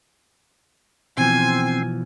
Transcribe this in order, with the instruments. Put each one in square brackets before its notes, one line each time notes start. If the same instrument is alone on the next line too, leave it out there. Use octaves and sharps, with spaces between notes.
[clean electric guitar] B2 E3 F3 [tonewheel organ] C4 [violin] G#5